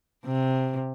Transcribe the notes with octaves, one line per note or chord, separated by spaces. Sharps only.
C3